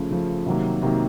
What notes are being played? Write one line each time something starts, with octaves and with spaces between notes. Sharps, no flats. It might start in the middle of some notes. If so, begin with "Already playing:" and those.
Already playing: C#3 F3 A3
C#3 F3 A3
C3 D#3 F#3 A#3
C3 D#3 F#3 A#3